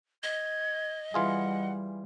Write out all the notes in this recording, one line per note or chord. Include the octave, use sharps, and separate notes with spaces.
D#5 G#6
E3 G3 F4 G#4 F#5